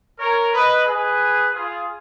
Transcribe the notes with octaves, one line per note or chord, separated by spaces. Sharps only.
A#4 C#5
B4 D#5
G#4 B4
F4 G#4